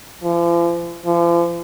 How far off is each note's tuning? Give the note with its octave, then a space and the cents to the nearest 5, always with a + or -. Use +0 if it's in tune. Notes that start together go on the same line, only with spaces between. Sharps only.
F3 -40
F3 -40